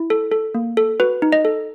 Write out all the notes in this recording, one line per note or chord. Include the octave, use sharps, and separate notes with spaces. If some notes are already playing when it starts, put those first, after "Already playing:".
Already playing: E4
A4
A4
A#3
A4
F#4 B4
D#4
D#5
A4